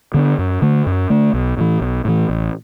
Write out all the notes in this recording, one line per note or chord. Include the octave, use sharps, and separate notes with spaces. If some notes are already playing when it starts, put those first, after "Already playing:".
D3 B3 D4
F#2
D3 A3
F#2
D3 A3
B1
A2 E3
B1
A2 E3
A1